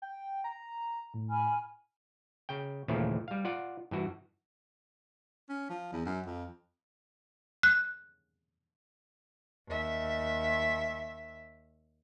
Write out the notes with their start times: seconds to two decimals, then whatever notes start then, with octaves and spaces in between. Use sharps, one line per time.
0.02 G5
0.44 A#5
1.14 A2
1.28 G#5 B5 F6
2.49 C#3 G5
2.88 D#2 A#2 C#3 E3 F3 A3
3.28 G3 F5
3.45 F4 D5 F#5
3.91 G2 E3 F#4
5.49 C#4
5.70 F3
5.93 E2
6.06 F#2
6.26 F2
7.63 F#6
9.69 D#2 E5